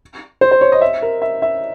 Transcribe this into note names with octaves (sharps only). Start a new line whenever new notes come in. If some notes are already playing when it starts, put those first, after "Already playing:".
C5
C5
C#5
D#5
E5
A#4
E5
E5